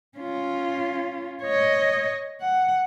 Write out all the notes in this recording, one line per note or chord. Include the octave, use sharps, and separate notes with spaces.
C#4 F4
C#5 D#5
F#5